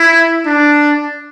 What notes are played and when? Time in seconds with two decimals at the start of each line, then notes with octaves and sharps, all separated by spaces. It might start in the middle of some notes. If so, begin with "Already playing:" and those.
Already playing: E4
0.46 D4